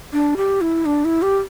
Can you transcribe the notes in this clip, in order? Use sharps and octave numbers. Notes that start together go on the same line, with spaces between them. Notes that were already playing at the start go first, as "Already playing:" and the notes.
D4
G4
E4
D4
E4
G4